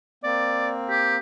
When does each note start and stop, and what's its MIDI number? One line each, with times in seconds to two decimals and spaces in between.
0.24 1.17 58
0.24 1.17 60
0.24 0.71 74
0.89 1.18 67